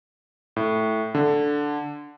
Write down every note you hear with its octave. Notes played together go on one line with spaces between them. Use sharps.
A2
D3